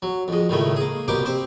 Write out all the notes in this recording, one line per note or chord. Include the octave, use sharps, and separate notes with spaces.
F#3
F2 G#3
C#2 A2 D#3 G#3 A3
A#3 G#4
C2 B2 A#3 G4 G5 D6
C4 G4 C5